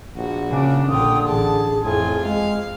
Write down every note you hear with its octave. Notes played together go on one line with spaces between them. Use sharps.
A#1 F#4
C#3 D4
A#1 D3 F4 G5 D#6
A1 G#4 A5
F2 A2 F4 G#5
G#3 F5